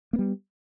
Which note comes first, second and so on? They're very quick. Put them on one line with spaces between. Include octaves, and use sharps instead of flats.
A#3 B3 G3